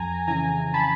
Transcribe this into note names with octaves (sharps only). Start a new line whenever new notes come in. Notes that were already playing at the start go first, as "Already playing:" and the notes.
Already playing: F2 G#5 A#5
C#3 E3 G#5 A#5
A5 B5